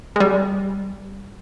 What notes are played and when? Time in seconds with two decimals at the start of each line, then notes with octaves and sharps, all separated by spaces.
0.16 G#3
0.20 G3